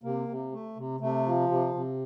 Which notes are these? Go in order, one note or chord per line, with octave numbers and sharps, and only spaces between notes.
C3 A#3
C3
A3
C3
C3 A3
F3
C3
C3